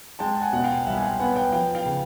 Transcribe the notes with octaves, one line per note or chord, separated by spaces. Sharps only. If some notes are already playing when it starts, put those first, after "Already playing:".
G#3 G5 A5
A5
F#5 G#5
B2 F#5
F5 G5
C2 E5 F#5
G#5
F5 G5
B3 F#5 G#5
F5 G5
F3 F5 G5
F5 G5
C#3